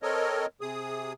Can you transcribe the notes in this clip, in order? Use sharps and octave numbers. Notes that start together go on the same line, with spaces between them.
C4 A4 A#4 C#5 D#5
C3 G#4 D#6